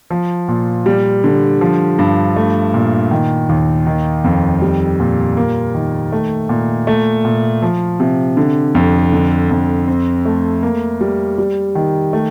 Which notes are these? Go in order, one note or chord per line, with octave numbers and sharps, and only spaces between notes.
F3
A#2
G3
D3
F3
G2
A3
A#2
D#3
D#2
D#3
F2
G3
A#2
A#3
D#3
A3
A#2
A3
A#2
F3
C3
D3
F2
D3
F2
C4
A3
A#3
G3
G3
D#3
A3